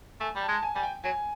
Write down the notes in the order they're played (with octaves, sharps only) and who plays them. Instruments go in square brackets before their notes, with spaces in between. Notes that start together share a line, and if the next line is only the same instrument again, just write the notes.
[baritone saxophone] A3 [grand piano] G#5
[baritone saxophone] G3
[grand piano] A5
[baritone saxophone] G#3
[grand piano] A5
G#5
[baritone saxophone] G3 [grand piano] G#5
[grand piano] G5
[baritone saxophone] F#3 [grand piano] G#5